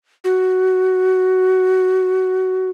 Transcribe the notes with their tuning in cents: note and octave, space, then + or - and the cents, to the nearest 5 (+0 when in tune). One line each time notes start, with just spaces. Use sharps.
F#4 +10